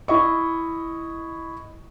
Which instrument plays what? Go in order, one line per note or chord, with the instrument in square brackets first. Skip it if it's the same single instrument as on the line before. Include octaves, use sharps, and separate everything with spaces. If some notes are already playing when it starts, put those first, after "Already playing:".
[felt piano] E4 D#5 C#6